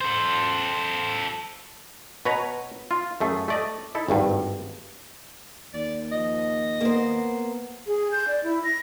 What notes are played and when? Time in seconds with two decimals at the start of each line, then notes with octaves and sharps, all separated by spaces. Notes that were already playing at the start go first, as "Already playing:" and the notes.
0.01 A4 C5
2.25 B2 B4 C#5 A#5
2.91 F4
3.20 F#2 A3 G#4
3.48 A3 D5 D#5
3.95 D#4 E4 A4
4.08 G#1 D2 G2
5.74 D#2 D5
6.12 F3 D#5
6.81 A#3 B3 C5
7.87 G#4
8.12 G6
8.28 D5
8.43 E4
8.64 A#6